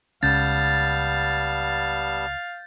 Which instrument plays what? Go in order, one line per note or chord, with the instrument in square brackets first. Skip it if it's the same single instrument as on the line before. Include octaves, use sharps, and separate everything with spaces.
[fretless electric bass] C#2 C#4 [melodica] G3 B3 A5 [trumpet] F5 [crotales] G6 A6